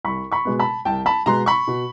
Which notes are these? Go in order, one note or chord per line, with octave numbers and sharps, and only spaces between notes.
C2 B5 C#6
B5 C#6
B2 G#3 B3
A5 B5
C2 G5 A5
A5 B5
B2 G#3 B3 A#5 C6
B5 C#6
B2